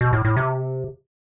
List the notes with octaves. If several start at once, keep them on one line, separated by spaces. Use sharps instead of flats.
B2
A2
A2
C3